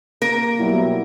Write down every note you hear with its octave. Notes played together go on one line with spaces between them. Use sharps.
A#3 A#4
B2 F#3 G3 E4